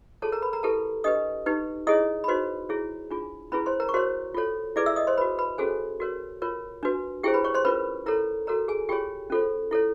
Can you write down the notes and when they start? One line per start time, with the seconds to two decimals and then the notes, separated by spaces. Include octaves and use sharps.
0.22 F4 G#4 A4 C#5 A5
0.32 A#4 A#5
0.42 B4 B5
0.53 A#4 A#5
0.63 E4 G4 A4 B4 A5
1.04 D4 G4 B4 D#5 D#6
1.46 D#4 G4 B4
1.87 E4 G#4 C#5 D#5 D#6
2.24 B5
2.28 D#4 F#4 B4 C5 C6
2.69 E4 G#4 C#5
3.11 D4 F4 G#4
3.52 C#4 E4 G#4 B4 B5
3.66 C5 C6
3.80 A#4 A#5
3.89 C#6
3.94 F#4 A#4 C5 C#5 C6
4.34 F4 A4 C#5
4.76 E4 G#4 B4 D5 D6
4.86 E5 E6
4.96 D#5 D#6
5.07 C5 C6
5.18 F#4 B4 B5
5.39 B4 B5
5.58 C#4 F#4 G#4 A4 C5 G#5
6.00 F#4 A#4 C#5
6.42 F4 A#4 C#5
6.83 D4 F#4 B4
7.23 E4 G4 G#4 C5 G5
7.34 B4 B5
7.44 C#5 C#6
7.54 C5 C6
7.65 C#4 F4 A#4 B4 B5
8.06 E4 A4 A#4 C#5 A#5
8.47 F#4 A4 A#4 C#5 A#5
8.68 G#4 G#5
8.89 F4 G4 G#4 C#5 G5
9.30 C#4 F4 A4 C5
9.71 E4 A4 C#5